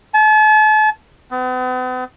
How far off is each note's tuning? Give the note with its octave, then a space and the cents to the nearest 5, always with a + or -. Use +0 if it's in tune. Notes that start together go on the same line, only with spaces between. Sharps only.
A5 -40
B3 +45